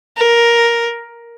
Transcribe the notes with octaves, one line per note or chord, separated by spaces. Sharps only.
A#4